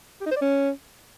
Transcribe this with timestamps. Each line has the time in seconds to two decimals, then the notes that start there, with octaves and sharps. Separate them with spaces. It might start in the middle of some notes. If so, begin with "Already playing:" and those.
0.21 G4
0.26 D#4
0.31 C5
0.36 D5
0.41 C#4